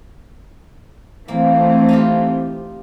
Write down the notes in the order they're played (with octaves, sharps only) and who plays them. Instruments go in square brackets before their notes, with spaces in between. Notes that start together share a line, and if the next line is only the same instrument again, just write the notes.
[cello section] E3 A3 C4 [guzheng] A#3
[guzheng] D#4 F4 G4